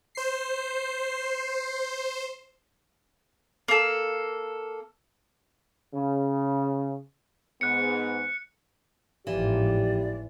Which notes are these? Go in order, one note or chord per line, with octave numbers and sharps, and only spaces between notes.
C5 C7
A#3 A4
C#3
G#2 B3 F#6 C#7
G#1 A2 E3 F3 G4 D5